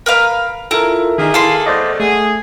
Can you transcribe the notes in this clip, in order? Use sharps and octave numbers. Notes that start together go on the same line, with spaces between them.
A#4 B4 F5
E4 F4 A4 A#4
D#3 A#3 D#4 F4 G#4 B6
E4 A4 F5 B5 C6 C7
E2 A3 C5 D5 D#5 F#5
A3 G#4